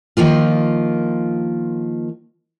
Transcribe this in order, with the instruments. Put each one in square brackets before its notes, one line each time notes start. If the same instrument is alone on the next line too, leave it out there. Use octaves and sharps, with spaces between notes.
[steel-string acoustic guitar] D#3 F3 A#3 F4